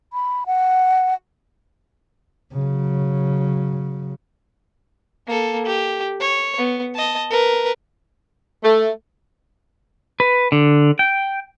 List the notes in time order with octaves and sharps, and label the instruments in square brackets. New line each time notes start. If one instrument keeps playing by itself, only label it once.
[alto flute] B5
F#5
[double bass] C#3 F#3
[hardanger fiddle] A#3 A4
G4
C#5
B3
D#5 A5
A#4 B4
[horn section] A3
[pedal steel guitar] B4
D3
G5